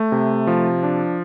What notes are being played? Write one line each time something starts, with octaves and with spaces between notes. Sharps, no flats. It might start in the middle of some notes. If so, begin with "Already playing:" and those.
Already playing: A3
C3
F3
D4